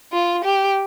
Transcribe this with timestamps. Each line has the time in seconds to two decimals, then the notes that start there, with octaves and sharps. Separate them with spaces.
0.12 F4
0.45 G4